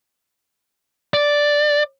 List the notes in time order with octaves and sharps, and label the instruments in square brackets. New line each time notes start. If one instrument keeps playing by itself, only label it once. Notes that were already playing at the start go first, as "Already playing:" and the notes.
[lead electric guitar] D5